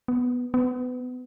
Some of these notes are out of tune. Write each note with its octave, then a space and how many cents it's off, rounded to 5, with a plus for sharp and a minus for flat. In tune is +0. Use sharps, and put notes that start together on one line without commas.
B3 +0
B3 +25